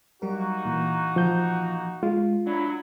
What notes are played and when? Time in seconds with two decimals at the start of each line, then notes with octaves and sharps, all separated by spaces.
0.22 F#3 G3 A#3 D#4 F#4 A#4
0.65 A#2 E3
1.16 F3 G6
2.03 G#3 F4
2.47 F#3 D4 E4